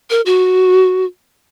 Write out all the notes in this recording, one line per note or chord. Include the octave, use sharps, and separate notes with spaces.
A#4
F#4